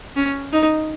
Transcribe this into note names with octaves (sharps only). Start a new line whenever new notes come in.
C#4
D#4